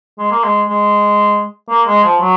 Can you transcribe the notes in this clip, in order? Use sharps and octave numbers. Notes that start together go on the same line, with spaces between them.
G#3
A#3
G#3
G#3
A#3
G#3
F3
F#3